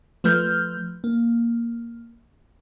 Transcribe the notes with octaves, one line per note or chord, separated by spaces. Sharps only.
F3 A3 B4 F6 G6
A#3